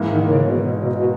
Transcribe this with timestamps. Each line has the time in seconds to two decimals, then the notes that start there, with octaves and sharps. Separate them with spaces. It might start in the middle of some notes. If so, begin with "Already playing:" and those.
Already playing: G#2 E3 A#3
0.08 D#3
0.25 C#3
0.43 B2
0.59 B2
0.76 B2
0.93 B2